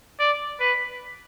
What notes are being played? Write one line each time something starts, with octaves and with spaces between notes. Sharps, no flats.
D5
B4